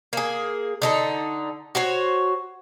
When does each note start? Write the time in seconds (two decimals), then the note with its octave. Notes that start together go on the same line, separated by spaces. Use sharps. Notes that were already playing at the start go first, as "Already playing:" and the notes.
0.13 A#3 G#4
0.82 D3 D#4 A4
1.75 F#4 C5 C#5